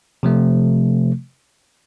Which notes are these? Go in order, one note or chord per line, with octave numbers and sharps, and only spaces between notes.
C3 F3 A3